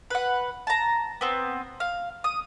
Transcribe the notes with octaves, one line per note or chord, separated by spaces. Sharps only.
B4 F#5
A5 A#5
B3 C4
F5
D#6